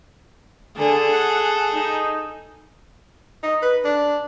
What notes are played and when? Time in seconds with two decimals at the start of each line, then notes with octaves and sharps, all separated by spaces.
0.77 D3 G#4 A4
1.13 F#5
1.71 D#4
3.43 D#4
3.62 B4
3.85 D4